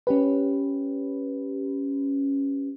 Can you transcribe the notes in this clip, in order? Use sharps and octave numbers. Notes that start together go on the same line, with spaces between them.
C#4 G4 B4